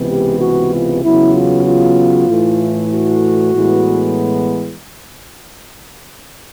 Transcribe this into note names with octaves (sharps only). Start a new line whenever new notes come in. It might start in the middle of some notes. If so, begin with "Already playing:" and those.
Already playing: C#2 C3 E3 G#3 B3
G4
F#4
F4
E2 C#3 F#3 B3 E4
F4
F4
A2 E3 A3
F#4
A2 E3 G#3 B3